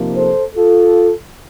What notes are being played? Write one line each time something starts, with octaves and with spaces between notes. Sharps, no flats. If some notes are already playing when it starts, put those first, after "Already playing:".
Already playing: C3 F3 A#3 D#4
A4 C5
F4 A4